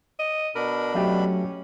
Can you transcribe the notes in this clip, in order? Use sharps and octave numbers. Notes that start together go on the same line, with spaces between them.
D#5
B2 D4 A#4 B5
F#3 A3 C#4 G4